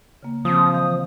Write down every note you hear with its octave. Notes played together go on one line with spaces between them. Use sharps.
C#3 A#3
C#3 F3 C4 D#6
D#3 E3 F5